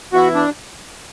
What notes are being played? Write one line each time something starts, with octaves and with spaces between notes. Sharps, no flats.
E3 B3 E4 F#4
D4